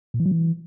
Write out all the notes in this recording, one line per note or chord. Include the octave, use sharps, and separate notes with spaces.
A#2
E3
F#3
E3